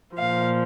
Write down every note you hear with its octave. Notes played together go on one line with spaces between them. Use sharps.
A#2 F3 F5